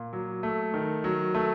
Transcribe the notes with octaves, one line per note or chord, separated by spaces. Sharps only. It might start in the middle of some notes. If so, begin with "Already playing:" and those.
Already playing: A#2
F#3
A3
D#3
F#3
A3